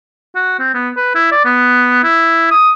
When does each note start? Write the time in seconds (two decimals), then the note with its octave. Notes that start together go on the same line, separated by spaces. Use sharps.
0.35 F#4
0.59 C4
0.74 B3
0.97 B4
1.15 E4
1.32 D5
1.45 B3
2.04 E4
2.51 D#6